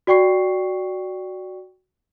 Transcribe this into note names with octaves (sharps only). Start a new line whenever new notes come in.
F#4 D5 G5 C#6 C7